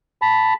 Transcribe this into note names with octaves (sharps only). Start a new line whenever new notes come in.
A5 B5